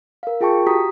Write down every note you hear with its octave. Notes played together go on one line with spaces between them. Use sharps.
A#4 F5
F4 G#4 G5 A5 C#6
F#4 G4 A#5 D#6 B6